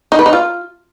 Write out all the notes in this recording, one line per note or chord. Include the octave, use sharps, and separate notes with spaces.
D#4
B4
D#4
F4